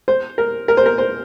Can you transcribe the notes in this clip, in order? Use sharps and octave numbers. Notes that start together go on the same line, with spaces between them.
C5
A#4
A#4
C5
A#4
C5